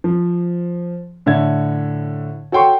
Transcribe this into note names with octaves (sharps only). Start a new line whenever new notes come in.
F3
A2 D3 E5 G#6
F#4 A4 C#5 G5 C6 C#6